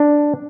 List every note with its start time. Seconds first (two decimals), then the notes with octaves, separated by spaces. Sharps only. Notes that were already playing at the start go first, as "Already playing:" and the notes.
Already playing: D4